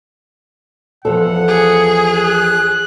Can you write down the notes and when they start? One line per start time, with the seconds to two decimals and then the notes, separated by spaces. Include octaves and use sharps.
1.05 E2 F3 A4 F#5
1.48 G#4
2.14 F#6